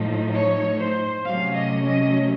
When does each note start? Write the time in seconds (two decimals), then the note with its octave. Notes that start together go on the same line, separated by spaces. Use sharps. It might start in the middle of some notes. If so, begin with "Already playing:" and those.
Already playing: A2 F3 A3 D#4
0.32 C#5
0.79 C5
1.25 C3 F#3 A3 C#4 F5
1.55 D#5
1.86 D#5